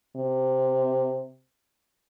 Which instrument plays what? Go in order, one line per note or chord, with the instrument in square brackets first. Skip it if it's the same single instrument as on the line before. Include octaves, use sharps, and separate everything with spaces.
[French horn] C3